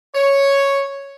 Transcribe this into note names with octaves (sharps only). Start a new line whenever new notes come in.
C#5